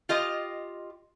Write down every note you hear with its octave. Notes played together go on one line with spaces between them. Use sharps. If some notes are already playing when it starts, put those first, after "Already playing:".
F4 G4 D#5